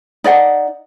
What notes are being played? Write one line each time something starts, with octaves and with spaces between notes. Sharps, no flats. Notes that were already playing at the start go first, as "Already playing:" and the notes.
D#4 D5 D#5 F#5